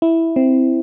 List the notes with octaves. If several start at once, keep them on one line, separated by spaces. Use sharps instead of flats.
E4
C4